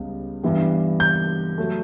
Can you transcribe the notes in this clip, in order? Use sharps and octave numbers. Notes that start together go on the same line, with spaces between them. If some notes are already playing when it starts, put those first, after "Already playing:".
Already playing: C#2 C#3 G3 B3
G2 E3 G3 B3
G6
F#3 A3